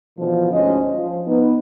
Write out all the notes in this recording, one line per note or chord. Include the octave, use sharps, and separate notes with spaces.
B2 D3 E3 F3
D2 G#2 C#4 C5 D#5
F3
B3 D#4